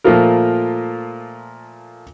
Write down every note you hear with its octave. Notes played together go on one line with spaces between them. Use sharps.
A#2 F3 A3 F4 A#4